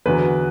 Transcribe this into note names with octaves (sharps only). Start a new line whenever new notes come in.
E2 D3 F#3 B4